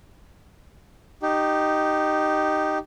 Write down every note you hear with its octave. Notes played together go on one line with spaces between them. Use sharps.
D#4 G4